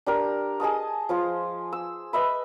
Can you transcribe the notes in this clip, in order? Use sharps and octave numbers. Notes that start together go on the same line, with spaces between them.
D4 G4 A#4
G#4 D#5 A5 D#6
F3 F4 C5
E6
B4 D#5 E5 B5